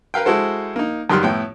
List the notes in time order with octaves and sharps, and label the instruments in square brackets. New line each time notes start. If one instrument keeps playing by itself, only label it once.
[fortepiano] A#4 B4 F5 G5
G#3 E4 F#4 A4 C5
A#3 D#4
F#2 D#3 G3 C6 F6 F#6
A2 B3 E4 G5